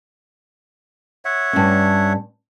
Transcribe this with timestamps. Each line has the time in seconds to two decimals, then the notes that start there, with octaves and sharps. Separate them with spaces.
1.25 C#5 E5 F#5
1.53 G2 C#4